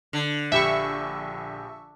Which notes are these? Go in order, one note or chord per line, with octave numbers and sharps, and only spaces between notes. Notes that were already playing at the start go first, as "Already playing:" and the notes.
D3
A#1 G4 E5 B5 C#6